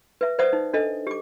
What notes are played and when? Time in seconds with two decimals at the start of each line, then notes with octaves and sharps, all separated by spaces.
0.21 B4 E5
0.39 B4 C5 D5 E5 F#5 D#6
0.53 D#4
0.74 D4 A4 D#5
1.07 G4 D6